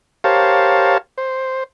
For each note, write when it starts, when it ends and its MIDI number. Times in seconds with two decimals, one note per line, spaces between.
0.24 0.98 67
0.24 0.98 70
0.24 0.98 72
0.24 0.98 73
0.24 0.98 77
0.24 0.98 81
1.18 1.64 72